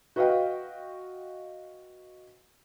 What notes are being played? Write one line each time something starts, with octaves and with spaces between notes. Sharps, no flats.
F#4 B4 D#5 F5 G5